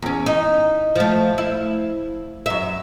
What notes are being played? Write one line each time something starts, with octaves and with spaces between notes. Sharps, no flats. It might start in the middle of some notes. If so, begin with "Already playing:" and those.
E2 C#4
D#4
F3 A3
E4
F#2 E5